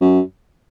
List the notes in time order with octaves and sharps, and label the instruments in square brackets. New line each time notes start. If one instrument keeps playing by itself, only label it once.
[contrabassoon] F#2